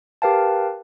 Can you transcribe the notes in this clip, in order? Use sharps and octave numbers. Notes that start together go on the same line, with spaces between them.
G4 A#4 B4 F5 G5 A5